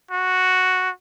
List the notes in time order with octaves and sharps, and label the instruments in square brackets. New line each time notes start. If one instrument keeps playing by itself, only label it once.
[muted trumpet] F#4